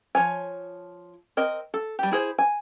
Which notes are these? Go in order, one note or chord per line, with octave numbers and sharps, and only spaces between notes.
F3 C#5 G#5
C4 A#4 D#5
A4
G3 G4
E4 G#4 C5
G#5